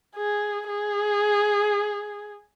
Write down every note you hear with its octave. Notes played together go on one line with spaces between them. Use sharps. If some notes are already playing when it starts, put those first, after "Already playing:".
G#4
G#4